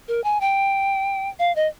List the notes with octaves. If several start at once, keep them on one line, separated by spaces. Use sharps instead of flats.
A#4
G#5
G5
F5
D#5